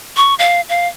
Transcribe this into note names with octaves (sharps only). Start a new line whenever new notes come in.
C#6
F5
F5